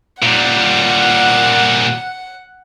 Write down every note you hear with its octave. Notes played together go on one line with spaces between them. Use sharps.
A#2 G3 F#5